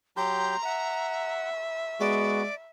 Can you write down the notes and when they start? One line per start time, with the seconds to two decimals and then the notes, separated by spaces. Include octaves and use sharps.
0.17 F#3 G4 A#5 C6 G6
0.65 E5 F#5
2.00 G#3 B3 F#4 D5